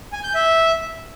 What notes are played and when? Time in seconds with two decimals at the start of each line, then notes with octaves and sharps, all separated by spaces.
0.12 G#5
0.24 G6
0.35 E5